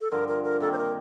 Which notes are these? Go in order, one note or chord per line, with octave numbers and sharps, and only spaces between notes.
A4
G2 D3 F3 A#4
A#4
A#4
C3 D#3 A#3 A4
C5
A#4